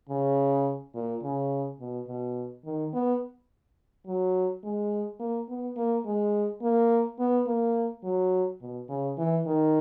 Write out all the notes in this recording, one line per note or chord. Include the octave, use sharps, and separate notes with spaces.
C#3
A#2
C#3
B2
B2
D#3
B3
F#3
G#3
A#3
B3
A#3
G#3
A#3
B3
A#3
F#3
B2
C#3
E3
D#3